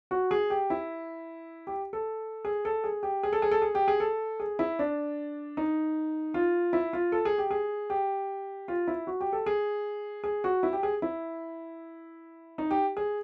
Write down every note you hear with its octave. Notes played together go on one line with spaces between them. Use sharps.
F#4
G#4
G4
E4
G4
A4
G#4
A4
G#4
G4
G#4
A4
G#4
A4
G#4
G4
G#4
A4
G#4
E4
D4
D#4
F4
E4
F4
A4
G#4
G4
G#4
G4
F4
E4
F#4
G4
A4
G#4
G#4
F#4
E4
G4
G#4
E4
D#4
G4
G#4